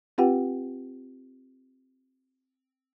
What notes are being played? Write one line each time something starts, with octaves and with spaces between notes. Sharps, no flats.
C4 F4 G4 B4 F#5 G5